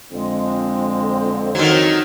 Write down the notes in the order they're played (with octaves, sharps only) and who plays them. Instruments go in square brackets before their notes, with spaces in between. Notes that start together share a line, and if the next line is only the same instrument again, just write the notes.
[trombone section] F2 D3 C4 [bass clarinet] G#3
[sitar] D#3 F#3